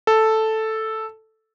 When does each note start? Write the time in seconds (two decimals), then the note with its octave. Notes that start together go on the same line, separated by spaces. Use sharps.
0.07 A4